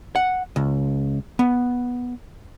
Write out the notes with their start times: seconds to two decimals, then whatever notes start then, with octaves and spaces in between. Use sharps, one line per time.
0.16 F#5
0.56 C#2
1.39 B3